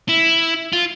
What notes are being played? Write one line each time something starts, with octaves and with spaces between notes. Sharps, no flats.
E4
F4